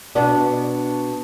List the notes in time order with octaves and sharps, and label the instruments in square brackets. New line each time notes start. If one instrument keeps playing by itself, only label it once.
[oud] B2 B3 D4